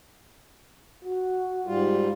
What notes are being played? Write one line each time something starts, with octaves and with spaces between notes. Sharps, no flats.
F#4
G#2 G3 F4